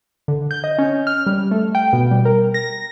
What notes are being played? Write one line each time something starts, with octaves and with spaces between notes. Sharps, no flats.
D3
G6
D#5
C#4
F6
G3
A3
G5
B2
G3
A#4
A#6